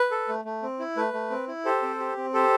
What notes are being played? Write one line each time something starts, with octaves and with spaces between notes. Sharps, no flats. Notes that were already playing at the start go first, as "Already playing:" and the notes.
Already playing: B4
A4
A3
A3
C4
E4
A3 B4
A3
C4
E4
G4 A4 C5
C4
G4
C4
G4 A4 C5